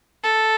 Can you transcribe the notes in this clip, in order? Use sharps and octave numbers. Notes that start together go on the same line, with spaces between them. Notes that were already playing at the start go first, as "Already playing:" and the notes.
A4